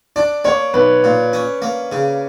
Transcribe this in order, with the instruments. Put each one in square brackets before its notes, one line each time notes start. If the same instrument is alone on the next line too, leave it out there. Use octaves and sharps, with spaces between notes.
[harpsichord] D4 [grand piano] D5
[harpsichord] A#3 [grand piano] C#5
[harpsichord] B1 [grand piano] B4
[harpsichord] A#2
C#4
A#3
C#3